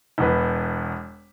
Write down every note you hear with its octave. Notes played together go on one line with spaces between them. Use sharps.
E1 E2 B4